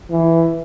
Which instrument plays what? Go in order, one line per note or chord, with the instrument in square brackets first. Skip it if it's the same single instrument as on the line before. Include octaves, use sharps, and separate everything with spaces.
[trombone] E3